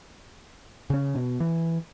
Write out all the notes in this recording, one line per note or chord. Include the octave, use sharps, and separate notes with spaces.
C#3 C#4
B2
E3